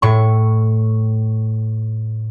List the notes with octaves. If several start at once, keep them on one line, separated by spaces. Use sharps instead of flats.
A2 C#6